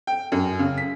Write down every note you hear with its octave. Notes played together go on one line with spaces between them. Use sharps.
G5
F#2
C#3
B6